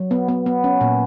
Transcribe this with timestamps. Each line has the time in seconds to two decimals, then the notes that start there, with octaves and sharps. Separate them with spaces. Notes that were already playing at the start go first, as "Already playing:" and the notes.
Already playing: F#3
0.11 B3
0.28 B3
0.46 B3
0.64 C#4
0.81 A#2